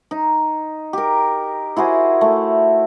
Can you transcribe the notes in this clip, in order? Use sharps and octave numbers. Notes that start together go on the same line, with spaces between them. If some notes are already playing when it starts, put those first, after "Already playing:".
D#4
G4 A#4
E4 F#4 G#4 C5
A3